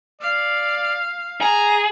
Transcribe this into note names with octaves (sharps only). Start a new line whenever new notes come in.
D5 F5
G#4 A#5